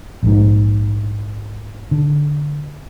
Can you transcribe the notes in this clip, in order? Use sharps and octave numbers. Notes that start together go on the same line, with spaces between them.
A#1 G#2
D3